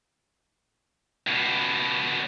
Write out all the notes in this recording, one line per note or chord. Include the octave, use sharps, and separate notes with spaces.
C#2 B2